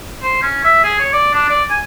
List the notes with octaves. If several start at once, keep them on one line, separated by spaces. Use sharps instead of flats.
C5
C#4
E5
G#4
C#5
D5
D4
D5
G#5